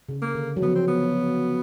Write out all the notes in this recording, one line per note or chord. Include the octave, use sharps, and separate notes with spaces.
C#3
A#3
D3
F#3
F3 B3
C4
B3